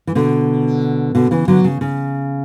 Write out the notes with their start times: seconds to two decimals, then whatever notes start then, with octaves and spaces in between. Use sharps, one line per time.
0.07 E3
0.15 B2 D3
1.15 B2 D3
1.31 C#3 E3
1.48 D3 F#3
1.64 C#3
1.81 C#3